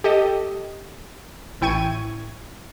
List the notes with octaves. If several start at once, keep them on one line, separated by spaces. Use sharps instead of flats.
G4 A4 D#5
A1 E4 G5 C#6 G#6 D#7